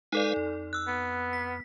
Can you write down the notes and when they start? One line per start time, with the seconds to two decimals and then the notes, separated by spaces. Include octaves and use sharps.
0.13 G#3 D#4 A4 B4 D5 F5
0.36 F2
0.73 E6 F#6
0.87 B3
1.33 B6